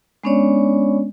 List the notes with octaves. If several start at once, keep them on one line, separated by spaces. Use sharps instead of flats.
G#3 B3 C#4 D4 C#5 D5